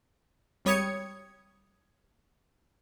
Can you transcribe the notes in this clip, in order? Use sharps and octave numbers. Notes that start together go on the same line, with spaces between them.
G#1 G3 C#5 D#6 G#6 C#7